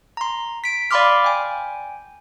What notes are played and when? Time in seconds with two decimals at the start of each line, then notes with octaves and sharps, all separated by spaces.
0.17 A#5 C6
0.64 B6 D7
0.91 D5 F5 B5 C6 D6 F6
1.24 G5 G#5